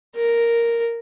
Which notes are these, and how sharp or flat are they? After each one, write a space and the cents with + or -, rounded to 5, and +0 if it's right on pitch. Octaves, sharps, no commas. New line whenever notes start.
A#4 +0